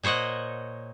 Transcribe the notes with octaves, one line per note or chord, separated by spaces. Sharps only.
A#2 C5 C#5 D#5 F#5